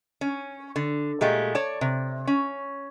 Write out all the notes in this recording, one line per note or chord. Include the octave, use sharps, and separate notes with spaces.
C#4
D3
A#2 G#3 A3 G4
C#5 D5 A5
C3
C#4